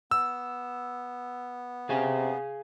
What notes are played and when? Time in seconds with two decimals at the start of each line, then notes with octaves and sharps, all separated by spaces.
0.11 B3 E6
1.89 C3 G#4 F5 G#5